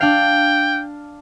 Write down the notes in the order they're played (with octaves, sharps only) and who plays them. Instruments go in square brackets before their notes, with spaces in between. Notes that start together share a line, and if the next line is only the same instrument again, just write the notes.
[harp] D4 F5 [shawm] G5